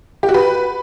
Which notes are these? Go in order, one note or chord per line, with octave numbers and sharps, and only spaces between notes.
G4
F#4
B4